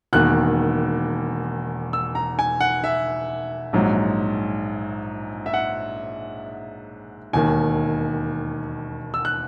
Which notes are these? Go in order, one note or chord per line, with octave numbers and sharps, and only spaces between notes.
E1 E2 D#3 A#3 F#6
E6
A#5
G#5
F#5
E5
A#1 G#2 F#3
E5
F#5
E1 D#2 D#3 G#5
E6
F#6